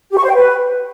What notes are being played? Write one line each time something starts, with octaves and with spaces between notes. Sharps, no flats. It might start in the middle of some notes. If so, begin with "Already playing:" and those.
G4
C#6
C5
G5
B4